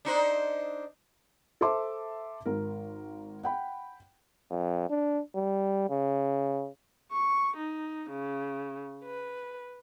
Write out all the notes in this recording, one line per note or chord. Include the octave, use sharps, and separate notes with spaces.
D4 D#4 C5
A4 C5 E5 A5 C6 D6
G#1 A#4
F#5 G5 B5
F2
D4
G3
C#3
C#6
D#4
C#3
B4